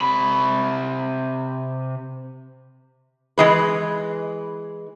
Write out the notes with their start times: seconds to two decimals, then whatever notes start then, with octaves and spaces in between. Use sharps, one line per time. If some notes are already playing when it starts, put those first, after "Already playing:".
0.01 C3 B5
3.38 E3 G#3 B4